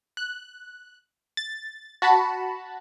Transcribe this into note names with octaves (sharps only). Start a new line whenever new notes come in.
F#6
A6
F#4 A5 B5